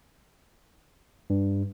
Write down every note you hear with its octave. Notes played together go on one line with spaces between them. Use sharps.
G2